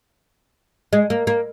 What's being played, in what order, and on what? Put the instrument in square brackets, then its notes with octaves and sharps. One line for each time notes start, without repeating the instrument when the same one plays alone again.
[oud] G#3
A#3
A#3